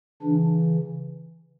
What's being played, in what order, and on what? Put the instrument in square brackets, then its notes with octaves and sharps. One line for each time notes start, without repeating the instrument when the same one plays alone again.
[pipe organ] C#3 E3 D4